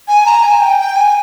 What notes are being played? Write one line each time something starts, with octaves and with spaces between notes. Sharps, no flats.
G#5
A#5
G#5
G5
G5
G#5